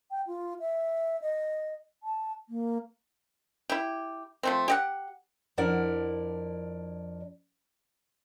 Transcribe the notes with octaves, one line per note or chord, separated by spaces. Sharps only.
G5
F4
E5
D#5
A5
A#3
E4 G4
F3 A3 C4
G4 D#5 F#5
F2 D4 E4 A#4 D5 F#5